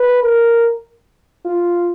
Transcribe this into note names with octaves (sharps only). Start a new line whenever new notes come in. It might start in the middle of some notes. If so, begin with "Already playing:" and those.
Already playing: B4
A#4
F4